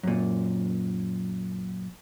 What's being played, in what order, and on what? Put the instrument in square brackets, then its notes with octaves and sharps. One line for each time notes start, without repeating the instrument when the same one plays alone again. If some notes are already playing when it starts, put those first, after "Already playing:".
[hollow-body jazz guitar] F#2 A#2